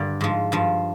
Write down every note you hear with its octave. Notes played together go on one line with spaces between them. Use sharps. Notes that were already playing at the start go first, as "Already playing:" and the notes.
Already playing: G2 D3 D5
G#2 F3
G2 F3